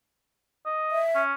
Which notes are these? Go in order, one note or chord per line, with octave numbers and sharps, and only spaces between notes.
D#5
E5
C#4